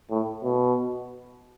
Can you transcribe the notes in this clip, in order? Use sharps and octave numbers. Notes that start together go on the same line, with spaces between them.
A2
B2